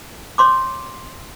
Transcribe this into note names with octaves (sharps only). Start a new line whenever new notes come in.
C#5 C6 D6